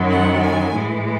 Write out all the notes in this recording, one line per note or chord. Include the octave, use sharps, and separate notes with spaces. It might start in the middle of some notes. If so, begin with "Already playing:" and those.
Already playing: F#2 D#3 F#3
F#5
G#5
A2 E3 G#3